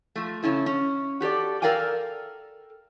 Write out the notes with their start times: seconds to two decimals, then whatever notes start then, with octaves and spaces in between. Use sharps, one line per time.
0.16 F3 A3
0.43 C#3 C#4 E4 A4
0.66 C#4
1.21 F#4 G4 A4 D5
1.62 A4 A#4 D5 F5 G5 G#5